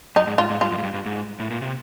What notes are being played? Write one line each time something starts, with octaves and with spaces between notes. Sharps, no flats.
F#2 D#4
G#2
G#2 F4
G#2
G2 F4
F#2
G#2
G2
G2
G#2
A2
A#2
C3